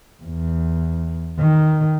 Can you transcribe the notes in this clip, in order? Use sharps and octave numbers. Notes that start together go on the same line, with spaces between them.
E2
D#3